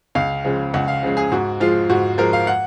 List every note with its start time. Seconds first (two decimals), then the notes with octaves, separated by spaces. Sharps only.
0.15 C#2 F5
0.45 C#3 F3 G#3
0.74 C#2 F#5
0.88 F5
1.03 C#3 F3 G#3
1.17 G#4
1.32 G#2 F#4
1.60 F3 G#3 F4
1.90 G#2 F#4
2.18 F3 G#3 A#4
2.33 F5
2.47 F#5